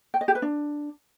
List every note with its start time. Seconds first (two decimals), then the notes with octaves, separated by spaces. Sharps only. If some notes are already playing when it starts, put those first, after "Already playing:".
0.14 G5
0.21 D#5
0.28 G4
0.35 B4
0.42 D4